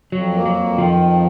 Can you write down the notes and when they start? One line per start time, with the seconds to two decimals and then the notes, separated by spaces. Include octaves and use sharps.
0.12 F2 F#3
0.34 A#3
0.46 F#3
0.56 F2
0.78 D#3 F3
1.00 F2